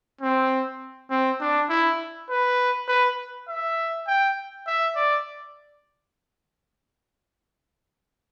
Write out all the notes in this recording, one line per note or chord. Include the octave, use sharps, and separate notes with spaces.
C4
C4
D4
E4
B4
B4
E5
G5
E5
D5